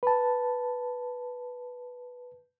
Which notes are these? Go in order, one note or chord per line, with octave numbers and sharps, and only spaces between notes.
B4 A5